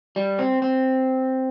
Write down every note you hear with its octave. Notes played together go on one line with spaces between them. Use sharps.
G3
C4
C4